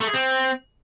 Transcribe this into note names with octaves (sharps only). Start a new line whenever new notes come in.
A3
G#4
C4